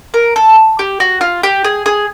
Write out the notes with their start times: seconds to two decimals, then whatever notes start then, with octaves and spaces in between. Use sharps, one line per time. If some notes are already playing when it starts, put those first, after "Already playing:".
0.14 A#4
0.36 A4
0.79 G4
1.00 F#4
1.21 F4
1.43 G4
1.64 G#4
1.86 G#4